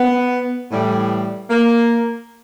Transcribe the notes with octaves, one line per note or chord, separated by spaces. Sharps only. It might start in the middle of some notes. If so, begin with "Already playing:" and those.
Already playing: B3
A2 E3 G3
A#3